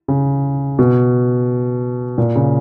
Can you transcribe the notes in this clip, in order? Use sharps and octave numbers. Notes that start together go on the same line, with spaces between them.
C#3
B2
A#2
C#3